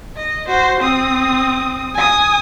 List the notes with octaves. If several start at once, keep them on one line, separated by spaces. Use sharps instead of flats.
D#5
F#4 C5
C4 D#6
G#5 D#6